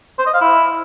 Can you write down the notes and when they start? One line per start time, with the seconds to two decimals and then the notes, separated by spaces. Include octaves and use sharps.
0.19 C5
0.26 D#5
0.34 F5
0.41 E4